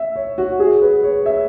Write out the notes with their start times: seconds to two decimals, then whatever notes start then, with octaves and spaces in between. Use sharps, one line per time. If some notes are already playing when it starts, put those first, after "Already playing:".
Already playing: E5
0.16 C#5
0.38 F#4
0.60 G#4
0.82 B4
1.03 C#5
1.26 E5